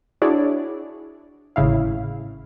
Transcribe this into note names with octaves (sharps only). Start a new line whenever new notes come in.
D4 E4 F#4 G#4 C#5 D5
G#1 A2 C#3 E4 F5